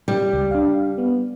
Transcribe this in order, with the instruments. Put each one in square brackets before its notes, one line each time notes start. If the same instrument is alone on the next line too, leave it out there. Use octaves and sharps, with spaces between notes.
[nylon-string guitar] G3
[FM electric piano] C#2
D4 F5
B3